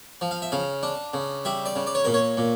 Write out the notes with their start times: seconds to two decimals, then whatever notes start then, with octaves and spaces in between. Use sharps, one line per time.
0.21 F3
0.31 F5
0.42 E5
0.52 C#3 F5
0.83 D4
1.13 C#3
1.45 G3 E5
1.66 D5
1.76 C#3
1.87 D5
1.95 C#5
2.04 A#2 A#4
2.14 C#5
2.37 A#2